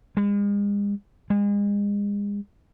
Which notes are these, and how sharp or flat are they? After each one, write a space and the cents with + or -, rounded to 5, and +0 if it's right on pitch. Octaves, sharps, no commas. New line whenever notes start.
G#3 -40
G#3 -35